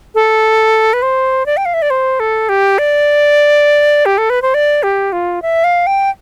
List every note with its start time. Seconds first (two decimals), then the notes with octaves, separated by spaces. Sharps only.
0.15 A4
0.93 B4
1.02 C5
1.46 D5
1.57 G5
1.65 F5
1.74 E5
1.82 D5
1.90 C5
2.20 A4
2.49 G4
2.78 D5
4.06 G4
4.18 A4
4.30 B4
4.42 C5
4.54 D5
4.83 G4
5.12 F4
5.42 E5
5.64 F5
5.87 G5